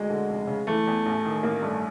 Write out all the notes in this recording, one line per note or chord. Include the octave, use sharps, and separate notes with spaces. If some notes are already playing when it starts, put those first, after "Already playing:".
Already playing: D2 G#3
D3
F1
C#3
E3 A3
E2
A1
D#3
A1 A#3
G2 A3